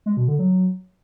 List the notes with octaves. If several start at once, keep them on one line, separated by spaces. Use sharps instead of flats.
G#3
B2
D3
F#3